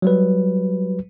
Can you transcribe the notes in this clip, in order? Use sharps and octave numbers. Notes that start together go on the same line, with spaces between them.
F#3 G3 B4